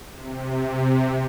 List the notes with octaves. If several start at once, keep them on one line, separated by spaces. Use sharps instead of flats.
C3